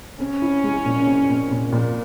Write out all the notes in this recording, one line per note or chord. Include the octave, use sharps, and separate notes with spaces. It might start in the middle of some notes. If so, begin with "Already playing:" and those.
C4 C#4
E4
G#3
A#2
C4
A#2
A#2
A#2